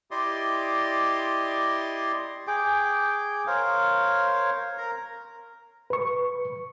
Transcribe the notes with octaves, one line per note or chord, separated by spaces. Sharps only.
E4 G4 D5 D#5 C6
G#4 G5 D6
A#4 C5 C#5 F5
A#4 A#5
B4 C#6